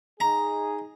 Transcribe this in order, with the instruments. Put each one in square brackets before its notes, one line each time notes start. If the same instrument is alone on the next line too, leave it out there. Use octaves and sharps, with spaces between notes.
[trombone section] D#4 G#4 [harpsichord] A#5